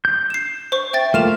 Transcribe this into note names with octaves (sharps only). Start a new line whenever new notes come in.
G6
C7 E7
C5 C#6
E5 G5 A6
A3 A#3 F4 F6 E7 F7